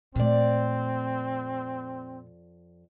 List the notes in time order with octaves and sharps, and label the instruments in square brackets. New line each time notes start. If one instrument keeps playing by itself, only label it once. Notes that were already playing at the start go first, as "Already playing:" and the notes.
[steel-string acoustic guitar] F2 D5 [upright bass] A#2 A3 [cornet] C4